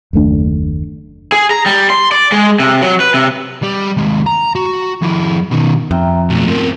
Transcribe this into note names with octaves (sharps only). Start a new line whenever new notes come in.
F#1 D#2 A3 D4
G#4
A#5
G3
C6
D5
G#3
C3
F#3
B4
C3
G3
D#2 G#3
A#5
F#4
F2 E4
B2 D#3
F2 E5 G5 A#5
B1 A3
G#2 F3 C4 A#4